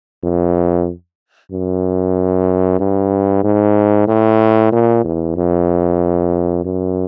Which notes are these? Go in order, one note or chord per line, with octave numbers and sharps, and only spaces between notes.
F2
F#2
G2
G#2
A2
A#2
E2
F2
F#2